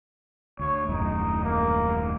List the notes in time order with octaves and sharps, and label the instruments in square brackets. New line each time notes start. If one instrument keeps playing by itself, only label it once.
[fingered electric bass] D2 [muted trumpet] C#5
[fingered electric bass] D#1 F#2 A2 [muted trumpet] D#4
[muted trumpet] A#3